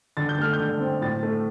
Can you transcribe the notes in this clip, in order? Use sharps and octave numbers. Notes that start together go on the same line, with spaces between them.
D3 A6
G6
A3 F6
G6
D3
C4
A2 A6
A3